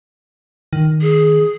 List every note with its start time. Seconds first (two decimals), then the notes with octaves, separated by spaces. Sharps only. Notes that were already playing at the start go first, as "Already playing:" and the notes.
0.73 D#3
1.02 G#4